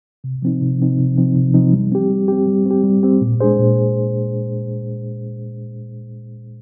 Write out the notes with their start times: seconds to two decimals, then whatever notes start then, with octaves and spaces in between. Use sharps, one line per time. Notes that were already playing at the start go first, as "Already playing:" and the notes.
0.24 C3
0.42 F3 C4 D#4
0.61 C3
0.80 F3 C4 D#4
0.99 C3
1.17 F3 C4 D#4
1.36 C3
1.54 F3 C4 D#4
1.73 G3
1.92 C4 G4
2.10 G3
2.28 C4 G4
2.47 G3
2.66 C4 G4
2.84 G3
3.03 C4 G4
3.21 A#2
3.40 G#3 D4 G#4 C5
3.59 A#2